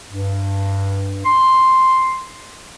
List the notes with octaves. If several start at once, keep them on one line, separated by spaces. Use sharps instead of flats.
G2
C6